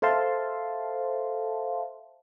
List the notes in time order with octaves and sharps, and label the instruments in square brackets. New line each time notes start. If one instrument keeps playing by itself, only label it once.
[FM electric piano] A4 C5 E5 F5 A5 C6